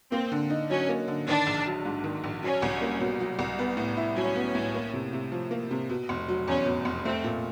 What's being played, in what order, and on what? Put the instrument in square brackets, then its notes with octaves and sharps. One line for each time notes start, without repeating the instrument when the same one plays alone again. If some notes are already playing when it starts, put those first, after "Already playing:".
[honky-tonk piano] A#3 [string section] C4
[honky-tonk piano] D3
D#4
[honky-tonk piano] F#3 [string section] C#4
[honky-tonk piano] A#3
D3
[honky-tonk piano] D#3 [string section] D4
[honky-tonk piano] A#1
F#3
G#2
D#3
A#1
[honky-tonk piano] F#3 [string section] C#4
[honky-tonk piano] C2
A#3
B2
F#3
C2
B3
A2
E4
[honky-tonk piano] F#3 [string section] C#4
[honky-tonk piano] B3
A2
A#3
C3
C3
F3
A#3
C3
B2
F1
F#3
[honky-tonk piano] E2 [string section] C#4
[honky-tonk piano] B2
F1
[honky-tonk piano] A3 [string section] C4
[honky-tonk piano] A#2